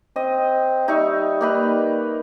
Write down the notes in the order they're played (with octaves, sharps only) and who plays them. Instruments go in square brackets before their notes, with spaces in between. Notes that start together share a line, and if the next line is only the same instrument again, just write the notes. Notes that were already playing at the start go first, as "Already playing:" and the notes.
[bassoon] C4 [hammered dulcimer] D#5
[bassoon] G3 [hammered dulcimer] D#4 E5 C#6
[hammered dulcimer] A#3 D#4 B4